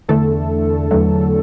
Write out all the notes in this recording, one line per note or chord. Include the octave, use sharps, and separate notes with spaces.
E2 D3 A3 A4
E2 D3 F#3 A3